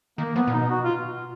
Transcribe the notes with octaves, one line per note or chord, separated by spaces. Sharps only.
D#3 A#3
F3 B3
A#2
B2 D#4
F#4
F4